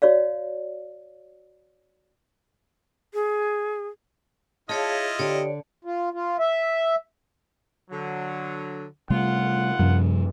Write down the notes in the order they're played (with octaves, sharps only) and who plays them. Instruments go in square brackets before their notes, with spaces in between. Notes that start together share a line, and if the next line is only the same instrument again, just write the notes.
[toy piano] F#4 C#5 D5 F5
[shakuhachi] G#4
[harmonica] E4 F4 D#5 [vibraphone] G#4 C#5 F5 [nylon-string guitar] A5
[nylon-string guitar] D3 [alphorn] G4 [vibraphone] C#5 D5
[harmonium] F4
F4
E5
[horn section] D3 F#3
[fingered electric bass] C3 G3 A3 [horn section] F4 F#5
[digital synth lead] F#2 [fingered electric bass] C3 F3 G3